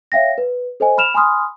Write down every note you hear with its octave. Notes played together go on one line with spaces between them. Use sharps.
C#5 E5 F5 G5 A#6
B4
A4 C5 D#5 G#5
B5 F6 E7 F7
G#5 B5 C6 D#6 F6